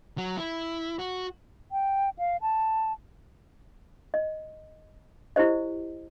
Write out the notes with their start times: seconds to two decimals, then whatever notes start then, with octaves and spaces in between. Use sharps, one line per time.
0.18 F#3
0.37 E4
0.99 F#4
1.72 G5
2.19 F5
2.41 A5
4.14 D#5
5.36 E4 G4 C5 D#5